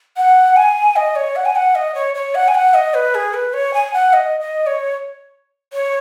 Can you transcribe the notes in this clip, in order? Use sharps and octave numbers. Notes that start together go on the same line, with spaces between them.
F#5
G#5
D#5
C#5
F#5
G#5
F#5
D#5
C#5
C#5
F#5
G#5
F#5
D#5
B4
G#4
B4
C#5
G#5
F#5
D#5
D#5
C#5
C#5